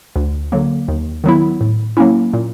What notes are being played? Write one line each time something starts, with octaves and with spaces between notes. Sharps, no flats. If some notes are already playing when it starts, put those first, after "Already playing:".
D2
D3 F#3 A#3
D#2
D#3 F#3 B3 E4
A2
F#3 A#3 C#4 E4
A#2